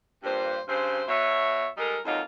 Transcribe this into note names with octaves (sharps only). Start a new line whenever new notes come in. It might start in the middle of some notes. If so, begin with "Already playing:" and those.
G2 A#2 C5
G2 C#3 C4 C5
B2 C#5 E5
G3 G#3 D#4 A4 A#4
F2 G#2 F#3 A#3 D#4 F4